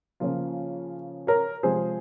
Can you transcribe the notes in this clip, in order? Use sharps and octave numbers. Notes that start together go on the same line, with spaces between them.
C#3 F3 A#3 F4
A#4 C#5
C3 F3 G#3 C4 G#4 C5